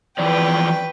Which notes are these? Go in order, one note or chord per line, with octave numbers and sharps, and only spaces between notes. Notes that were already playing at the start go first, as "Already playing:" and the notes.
E3 F3 B4 D5 G5